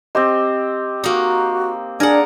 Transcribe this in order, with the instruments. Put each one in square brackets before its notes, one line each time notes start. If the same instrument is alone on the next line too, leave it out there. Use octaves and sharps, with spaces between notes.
[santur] C4 G4 C5 [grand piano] D#5
[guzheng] A#3 D#4 [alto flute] F#4
[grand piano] D4 [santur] G#4 G#5 [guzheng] A#4 F#5 [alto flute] D5